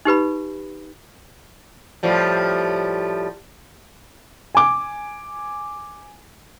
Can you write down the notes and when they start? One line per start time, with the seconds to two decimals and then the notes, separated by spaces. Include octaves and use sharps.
0.05 D#4 G4 B4 B5
2.03 A2 F3 G3
4.55 G#5 D6